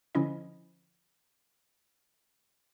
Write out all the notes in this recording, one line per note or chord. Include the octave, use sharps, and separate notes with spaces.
D3 F3 C#4 E4 D#5